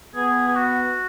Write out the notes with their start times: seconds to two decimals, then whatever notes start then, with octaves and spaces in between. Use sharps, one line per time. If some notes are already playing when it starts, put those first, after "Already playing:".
0.16 B3 G#4
0.48 G#4
0.56 F#4